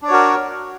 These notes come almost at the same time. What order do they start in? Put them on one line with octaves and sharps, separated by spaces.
D4 D5 C#5 F#4 A#4